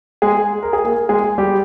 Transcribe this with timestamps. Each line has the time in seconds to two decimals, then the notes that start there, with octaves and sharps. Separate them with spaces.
0.22 G#3 G#4
0.63 A#4
0.73 G#4
0.84 A#3 A#4
1.09 G#3 G#4
1.38 G3 G4